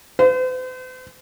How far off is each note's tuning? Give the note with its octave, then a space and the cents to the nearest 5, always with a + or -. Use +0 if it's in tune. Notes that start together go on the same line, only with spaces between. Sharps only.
C5 -45